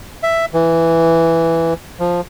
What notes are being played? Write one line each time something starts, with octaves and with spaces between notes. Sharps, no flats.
E5
E3
F3